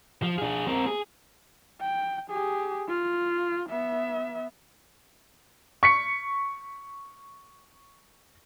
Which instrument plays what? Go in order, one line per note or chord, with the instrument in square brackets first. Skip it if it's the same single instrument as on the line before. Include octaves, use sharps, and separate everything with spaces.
[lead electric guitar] F3
D4 G#4
C4 A#4
G#4
[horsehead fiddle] G5
G4 G#4
F4
B3 E5
[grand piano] C#6 B6 C#7